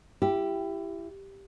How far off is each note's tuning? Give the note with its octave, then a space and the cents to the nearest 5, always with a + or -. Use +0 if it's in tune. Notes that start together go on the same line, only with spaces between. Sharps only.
E4 +25 G4 +0